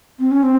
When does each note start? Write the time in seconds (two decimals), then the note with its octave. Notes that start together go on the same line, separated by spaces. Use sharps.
0.20 C4
0.31 C#4
0.43 C4